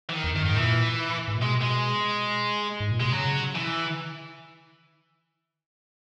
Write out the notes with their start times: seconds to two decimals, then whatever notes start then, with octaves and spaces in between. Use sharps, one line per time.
0.09 E3
0.13 D#3
0.24 E2
0.34 F#2 D#3
0.45 G#2 D#3
0.56 A#2 E3
1.28 G#2
1.35 A#2
1.42 B2 G#3
1.61 G#3
2.80 G#2
2.92 A#2
3.00 B2 G#3
3.11 C#3 F#3
3.55 E3